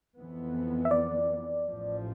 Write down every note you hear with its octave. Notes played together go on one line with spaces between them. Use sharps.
F2 E3 B3
E5
D5
A1 A2 F3